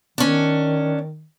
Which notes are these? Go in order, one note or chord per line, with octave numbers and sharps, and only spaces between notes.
D#3 C#4 D4